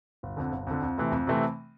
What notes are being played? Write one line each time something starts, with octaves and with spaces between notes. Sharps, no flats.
G1
F2 D3
G1
F2 D3
F2
C3 E3 A3 C4
F2
C3 E3 A3 C4